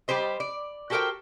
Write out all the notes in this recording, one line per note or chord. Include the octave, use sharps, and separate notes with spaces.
G3 G4 B4 C5 D#5
D5
F#4 G4 A4 A#4 C5 G5